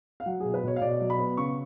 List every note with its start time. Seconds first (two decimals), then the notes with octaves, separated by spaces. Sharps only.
0.20 F5
0.26 F#3 F#5
0.40 B2 G#4
0.54 B4
0.64 B2 C#5
0.76 F5
0.81 B2 D5
1.00 F#3
1.10 B5
1.19 B3
1.37 C#3 C#6